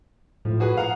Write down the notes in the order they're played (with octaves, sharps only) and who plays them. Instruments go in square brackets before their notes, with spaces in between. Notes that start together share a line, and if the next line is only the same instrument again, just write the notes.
[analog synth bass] A2 [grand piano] F3
[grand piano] F#4 G#4 B4
F5 F#5 A#5